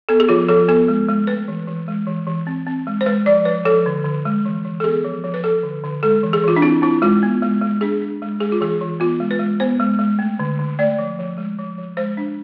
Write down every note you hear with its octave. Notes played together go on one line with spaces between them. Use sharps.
B3 A4
G#4
F3 F4
F3 A4
B3 A4
G#3
G#3
A3 B4
E3
E3
G#3
E3
E3
C4
C4
G#3
C5
G#3 B4
F3 D5
F3 B4
F3 A4
D3
D3
G#3
E3
E3
A4
B3 G#4
F3
F3
B4
F3 A4
D3
D3
G#3 A4
E3
G#4
E3 F4
D4
C4 E4
C4 E4
G#3 F4
B3
G#3
G#3
D4 G#4
D4
G#3
G#3 G#4
F4
E3 G#4
E3
B3 F4
G#3
B4
G#3
B3 C5
G#3
G#3
A3
D3
D3
A3 D5
F3
F3
G#3
F3
F3
G#3 C5
D4